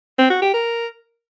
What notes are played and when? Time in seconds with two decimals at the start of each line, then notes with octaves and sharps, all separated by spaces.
0.19 C4
0.30 F#4
0.42 G4
0.54 A#4